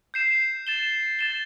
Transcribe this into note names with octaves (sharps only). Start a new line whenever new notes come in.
G6 C7 E7
A6 E7 G7
A6 E7 G7